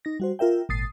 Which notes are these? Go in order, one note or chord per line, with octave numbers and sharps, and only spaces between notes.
D#4 A#6
G3 F#4 C5
F4 A#4 E5 G5
G#1 A#2 D#6 A6 C7